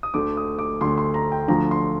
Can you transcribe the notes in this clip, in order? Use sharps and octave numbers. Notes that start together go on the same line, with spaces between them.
D#6
D2 D3 A3 D6
D#6
D6
D2 D3 A3 C6
C6
A#5
G5
D2 D3 F3 A3 A#5
C6